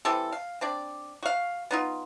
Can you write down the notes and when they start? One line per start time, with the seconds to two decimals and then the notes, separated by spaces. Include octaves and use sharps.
0.05 E3 G3 C4 A4
0.32 F5
0.61 C4 D4 D5
1.23 F#4 F5
1.71 B3 D#4 F4